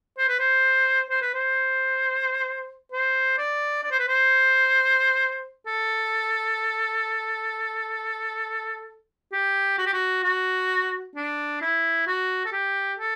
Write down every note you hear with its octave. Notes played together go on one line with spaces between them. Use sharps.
C5
B4
C5
C5
B4
C5
C5
D5
D5
C5
B4
C5
A4
G4
F#4
G4
F#4
F#4
D4
E4
F#4
A4
G4
A4